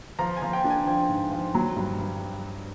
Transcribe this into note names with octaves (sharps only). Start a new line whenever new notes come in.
F3 A#5
G#5
F3
G5
D4
G#5
F3 G5
G#2
F3
F#3
G2
G2